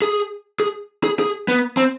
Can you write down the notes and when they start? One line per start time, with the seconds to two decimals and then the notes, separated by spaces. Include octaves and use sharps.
0.02 G#4
0.60 G#4
1.04 G#4
1.19 G#4
1.48 B3
1.77 C4